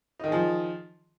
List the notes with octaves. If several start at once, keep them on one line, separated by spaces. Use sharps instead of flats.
D#3 F3 D#4 G#4